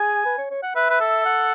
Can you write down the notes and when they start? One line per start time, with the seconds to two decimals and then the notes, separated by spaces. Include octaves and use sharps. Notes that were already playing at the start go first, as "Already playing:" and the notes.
Already playing: G#4 G#5
0.25 B4
0.38 C#5
0.50 C#5
0.63 F#5
0.75 B4 E5
0.90 B4
1.01 A4
1.25 F#5